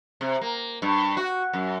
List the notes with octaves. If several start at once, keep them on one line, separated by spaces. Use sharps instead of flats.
C3
A#3
G2
F#4
F#2